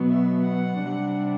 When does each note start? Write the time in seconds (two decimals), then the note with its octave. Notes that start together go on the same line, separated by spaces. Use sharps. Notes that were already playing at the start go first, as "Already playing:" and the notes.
Already playing: B2 F#3 B3
0.09 E5
0.46 F#5
0.83 C3 G3 D4